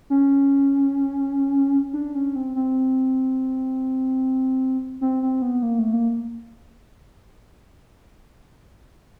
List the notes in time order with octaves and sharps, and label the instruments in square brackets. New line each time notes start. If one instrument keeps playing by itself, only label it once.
[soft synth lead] C#4
D4
C#4
C4
C4
C4
C4
B3
A#3
A3
A#3